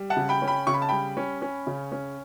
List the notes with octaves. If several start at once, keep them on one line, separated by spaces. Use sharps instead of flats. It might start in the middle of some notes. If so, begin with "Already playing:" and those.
Already playing: G3
F#5 A5
C#3
G5 B5
C#4
G5 B5
C#3 C#6
B5
A5
G3 G5 B5
C#4
C#4
C#3
C#4